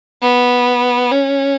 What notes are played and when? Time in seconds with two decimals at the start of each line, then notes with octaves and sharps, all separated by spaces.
0.22 B3
1.11 C#4